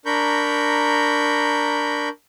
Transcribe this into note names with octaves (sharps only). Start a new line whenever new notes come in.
D4 A#4 A#5 B5 C#6 G6